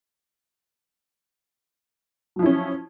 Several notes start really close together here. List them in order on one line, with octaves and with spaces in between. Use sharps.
F#3 F3 E4 C#4